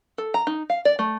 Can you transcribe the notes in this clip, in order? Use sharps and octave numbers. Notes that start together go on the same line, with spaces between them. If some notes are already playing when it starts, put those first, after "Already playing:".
A4
A#5
D#4
F5
D5
A3